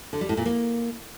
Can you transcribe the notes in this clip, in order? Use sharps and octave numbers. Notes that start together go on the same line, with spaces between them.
D3
G3
A2
A#2
A#3